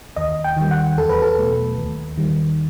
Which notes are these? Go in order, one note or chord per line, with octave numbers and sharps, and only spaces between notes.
D#2 D#5
G5
D#3 G3
F#5
E2 A4
B4
A4
B2 F#3 A3
D#2
D#3 G3